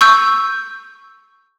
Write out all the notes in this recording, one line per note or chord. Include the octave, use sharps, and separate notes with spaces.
C#6 E6 G6